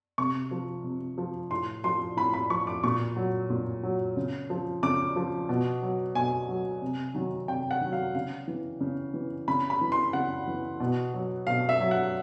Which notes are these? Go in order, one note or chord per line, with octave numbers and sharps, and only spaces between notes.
C3 C#6
F3
C3
F3
A2 C6
F3 C6
A2 B5
B5
F3 C#6
D6
A#2 C#6
F#3
A#2
F#3
C#3
F3
C#3 D6
F3
B2
F#3
B2 G#5
F#3
C3
D#3 F#3
C3 G5
F#5
D#3 F#3
F5
C#3 F5
E3
C#3
E3
C#3 B5
B5
E3
C6
C#3 F#5
E3
B2
F#3
B2 F5
E5
F#3
F#5